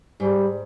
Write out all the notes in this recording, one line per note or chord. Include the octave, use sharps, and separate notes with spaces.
G#2 G3